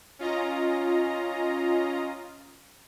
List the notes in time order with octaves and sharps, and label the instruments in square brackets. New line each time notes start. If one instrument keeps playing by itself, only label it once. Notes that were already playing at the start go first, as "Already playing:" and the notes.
[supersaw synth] C#4 F4 D#5 A#5